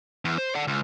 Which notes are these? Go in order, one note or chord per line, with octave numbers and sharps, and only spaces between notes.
E2
C5
D5 F#5
C#2